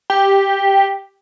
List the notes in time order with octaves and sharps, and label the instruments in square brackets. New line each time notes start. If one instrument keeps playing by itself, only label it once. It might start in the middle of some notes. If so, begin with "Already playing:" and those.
[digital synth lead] G4